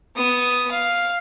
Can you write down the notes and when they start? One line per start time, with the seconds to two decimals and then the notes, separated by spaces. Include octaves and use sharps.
0.15 B3 D#6
0.71 F5